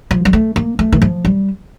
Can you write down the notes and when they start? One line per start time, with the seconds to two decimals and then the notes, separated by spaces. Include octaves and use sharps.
0.11 F3
0.25 G3
0.33 A3
0.56 A#3
0.79 A3
0.92 D#3
1.02 F3
1.25 G3